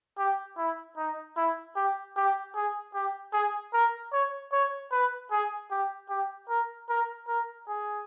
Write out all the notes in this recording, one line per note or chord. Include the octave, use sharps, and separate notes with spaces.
G4
E4
D#4
E4
G4
G4
G#4
G4
G#4
A#4
C#5
C#5
B4
G#4
G4
G4
A#4
A#4
A#4
G#4